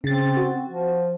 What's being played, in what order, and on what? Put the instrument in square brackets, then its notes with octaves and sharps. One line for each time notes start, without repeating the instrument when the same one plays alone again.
[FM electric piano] C#3 A6 [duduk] C4
[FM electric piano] F#4
[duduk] F3